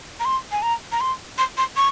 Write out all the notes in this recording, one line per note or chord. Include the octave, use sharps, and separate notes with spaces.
A#5
C6
G#5
A#5
A#5
C6
C6
C6
C#6